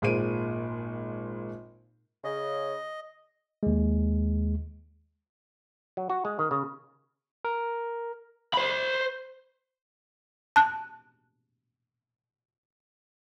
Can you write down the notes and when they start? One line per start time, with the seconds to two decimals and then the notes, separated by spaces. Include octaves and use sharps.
0.02 G#1 A#2 G#4 C5 D7 D#7
2.24 C#3 D#5
3.63 D#2 G#3
5.97 F#3
6.10 F#4
6.25 G#3
6.39 D#3
6.51 C#3
7.45 A#4
8.54 C5 B5
10.56 A5 F#6